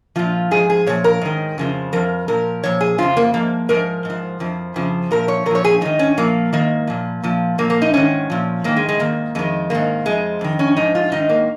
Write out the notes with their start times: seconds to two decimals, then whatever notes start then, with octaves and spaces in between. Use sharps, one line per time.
0.16 A#2 F3 F4
0.51 G#2 F3 G#4
0.70 G#4
0.87 A#2 F3 C#5
1.04 A#4
1.21 G#2 D#3
1.58 F2 C#3 F3
1.93 F2 F3 A#4
2.28 A#2 F3 A#4
2.64 A#2 F3 C#5
2.81 G#4
2.98 F2 C#3 F3 F4
3.17 A#3
3.34 G#2 F3 A#3
3.69 G#2 F3 A#4
4.05 G#2 F3
4.40 F2 F3
4.76 F2 C#3 F3
5.11 A#2 F3 A#4
5.28 C#5
5.46 A#2 A#4
5.51 F3 C#5
5.64 G#4
5.81 G#2 D#3 D#4
5.99 C#4
6.17 A#2 F3 A#3
6.53 G#2 D#3 A#3
6.87 A#2 F3
7.23 A#2 F3
7.58 A#2 F3 A#3
7.70 A#3
7.82 D#4
7.94 G#2 D#3 C#4
8.30 A#2 F3
8.64 G#2 D#3 A#3
8.76 G#3
8.89 G#3
8.99 G#2 D#3 A#3
9.35 F2 D#3 G#3
9.70 G#2 D#3 A#3
10.05 F2 F3 G#3
10.41 F2 D#3
10.59 C#4
10.76 G#2 F3 D#4
10.95 F4
11.12 G#2 D#3 D#4
11.29 A#3